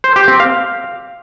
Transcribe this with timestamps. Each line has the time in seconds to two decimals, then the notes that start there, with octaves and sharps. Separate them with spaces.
0.04 C5
0.16 G4
0.28 C4
0.40 F5